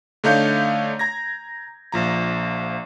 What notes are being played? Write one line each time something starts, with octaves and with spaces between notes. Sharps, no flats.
D3 A3 D#4 C#5 F5 G6
A#5 G#6 A#6
A#1 F3 A#5